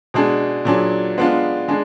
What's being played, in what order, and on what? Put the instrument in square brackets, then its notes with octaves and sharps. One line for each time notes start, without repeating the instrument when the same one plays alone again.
[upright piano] B2 G#3 D4 G#4
A#2 F#3 D4 G#4
G#3 B3 D4 F4
G#3 D4 G#4